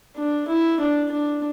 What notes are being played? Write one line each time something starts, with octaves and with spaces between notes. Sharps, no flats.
D4
E4
D4
D4